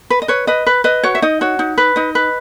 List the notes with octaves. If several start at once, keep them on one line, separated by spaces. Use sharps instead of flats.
B4
D#5
B4 C#5
B4 D#5
B4
B4 D#5
F#4 C#5
E5
D#4 D#5
F#4 C#5
D#4
B4
D#4 D#5
B4